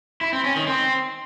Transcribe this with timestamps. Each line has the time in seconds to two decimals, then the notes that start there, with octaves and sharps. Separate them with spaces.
0.21 E4
0.33 C4
0.44 C#4
0.56 D#3
0.67 C4